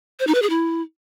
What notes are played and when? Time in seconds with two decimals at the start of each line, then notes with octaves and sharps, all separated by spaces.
0.20 C5
0.27 D#4
0.35 B4
0.42 G#4
0.50 E4